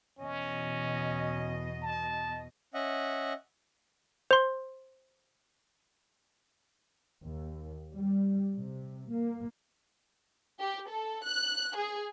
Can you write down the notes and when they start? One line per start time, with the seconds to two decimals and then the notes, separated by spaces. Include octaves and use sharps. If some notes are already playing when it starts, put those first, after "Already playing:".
0.19 E2 B2 C#4 D#5
1.83 A5
2.74 C#4 D#5 E5 F#5
4.31 C5 C6
7.23 D#2
7.95 G3
8.56 C3
9.11 A#3
10.60 G4
10.90 A4
11.24 F#6
11.76 G#4